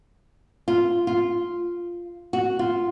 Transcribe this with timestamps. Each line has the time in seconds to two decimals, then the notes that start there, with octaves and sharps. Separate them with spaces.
0.68 F4
1.07 F4
2.33 F#4
2.59 F4